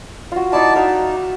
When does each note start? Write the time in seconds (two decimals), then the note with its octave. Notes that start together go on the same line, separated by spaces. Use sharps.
0.32 F4 F#4
0.53 D#4 E4 D5 A5
0.76 D#4 F#4 E5 F5